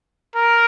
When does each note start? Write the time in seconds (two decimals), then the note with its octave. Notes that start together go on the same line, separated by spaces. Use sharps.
0.36 A#4